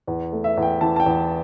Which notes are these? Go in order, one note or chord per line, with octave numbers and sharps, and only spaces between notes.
E2
A3
E5
E2
G5
E3 A5
A5
G5
E2